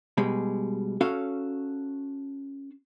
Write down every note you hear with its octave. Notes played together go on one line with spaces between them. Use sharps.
B2 G3 G#3
C#4 F#4 A4 F5